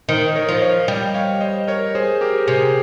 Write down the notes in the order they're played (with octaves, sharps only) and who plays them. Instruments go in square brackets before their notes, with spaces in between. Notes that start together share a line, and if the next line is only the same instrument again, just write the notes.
[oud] D#3 [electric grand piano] C5 D#5
[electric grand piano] A#4 C#5
[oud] F3
[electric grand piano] C#5 F5
[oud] G3 [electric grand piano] D#5 G5
[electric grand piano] C#5 F5
C5 D#5
A#4 C#5
G#4 C5
G4 A#4
[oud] C3 [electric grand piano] G#4